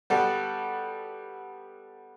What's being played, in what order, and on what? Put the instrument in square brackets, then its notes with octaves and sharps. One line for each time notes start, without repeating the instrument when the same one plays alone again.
[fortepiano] G3 B3 F#4 A4